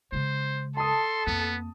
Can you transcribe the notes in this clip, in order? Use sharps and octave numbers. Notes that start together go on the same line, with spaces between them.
C#3 G#3 C5
A4 A5 C6 D#6
F2 A#3 B3